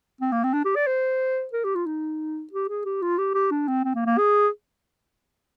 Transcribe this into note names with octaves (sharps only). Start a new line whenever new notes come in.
C4
A#3
C4
D4
G4
D5
C5
A#4
G4
F4
D#4
G4
G#4
G4
F4
G4
G4
D4
C4
C4
A#3
A#3
G#4